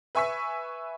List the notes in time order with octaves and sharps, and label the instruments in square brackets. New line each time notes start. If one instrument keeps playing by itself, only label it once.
[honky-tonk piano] B4 E5 G#5 C#6 E6 B6